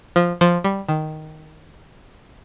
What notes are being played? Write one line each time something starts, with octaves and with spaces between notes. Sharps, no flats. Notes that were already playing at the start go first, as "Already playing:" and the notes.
F3
F3
G3
D#3